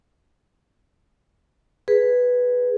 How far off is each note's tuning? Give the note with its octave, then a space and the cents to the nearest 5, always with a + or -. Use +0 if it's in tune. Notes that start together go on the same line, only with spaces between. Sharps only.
G#4 +0 B4 +0